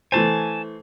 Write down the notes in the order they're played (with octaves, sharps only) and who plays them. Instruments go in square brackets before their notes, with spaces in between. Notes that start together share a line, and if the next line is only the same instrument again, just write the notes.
[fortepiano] E3 A3 C5 [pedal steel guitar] G#5 A5